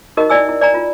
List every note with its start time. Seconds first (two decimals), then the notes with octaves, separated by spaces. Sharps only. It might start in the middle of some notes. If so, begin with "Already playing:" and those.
0.17 D#4 F#4 G4 A#4 D#5
0.30 E4 D5 G#5 E6
0.49 E4
0.61 D5 G#5 A#5
0.74 F4